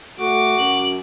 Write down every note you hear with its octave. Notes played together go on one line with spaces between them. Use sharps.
A3 F#4 D6
F#2 F#7